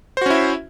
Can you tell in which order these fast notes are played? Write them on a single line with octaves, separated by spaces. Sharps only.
C5 F#4 C#4 E4 E5